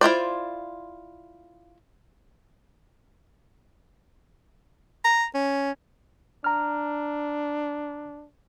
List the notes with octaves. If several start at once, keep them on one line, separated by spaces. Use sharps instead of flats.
E4 F4 C5 D5
A#5
C#4
D4 A#5 F6